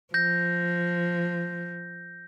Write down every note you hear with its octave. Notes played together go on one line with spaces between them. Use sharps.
F3 G6 A#6